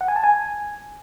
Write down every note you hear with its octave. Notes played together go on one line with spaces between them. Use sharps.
F#5
G#5
A5
G#5